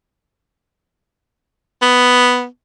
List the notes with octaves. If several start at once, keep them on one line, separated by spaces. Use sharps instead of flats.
B3